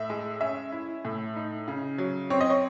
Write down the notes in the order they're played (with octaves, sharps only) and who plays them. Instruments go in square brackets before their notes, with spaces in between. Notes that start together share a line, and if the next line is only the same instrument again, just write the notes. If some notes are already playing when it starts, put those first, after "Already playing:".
Already playing: [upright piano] A2 E5
G#3
C#4 E5
E4
A2
D#4
C#3
F#3
C4 C#5
D#5
C#5